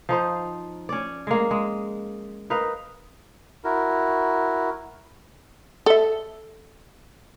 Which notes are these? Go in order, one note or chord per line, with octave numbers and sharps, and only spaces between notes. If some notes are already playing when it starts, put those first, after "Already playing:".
F3 D#4 C5
C#4 D5
G#3 A#3
G#3
D#4 A#4 B4 F5
E4 F#4 A#4
A4 E5